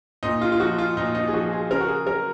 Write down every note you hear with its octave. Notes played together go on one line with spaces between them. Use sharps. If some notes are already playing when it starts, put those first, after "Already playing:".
A#2 D#4
F4
F4
F3 F#4
F4
A#2 D#4
D#4
G#4
F3 F#4
G#4
C#3 A#4
F#4
G#4
F#3 A#4